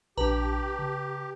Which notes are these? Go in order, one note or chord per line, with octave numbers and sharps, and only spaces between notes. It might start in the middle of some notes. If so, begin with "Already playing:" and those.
A#1 C3 D4 G4 B4 A5 A#5
C#3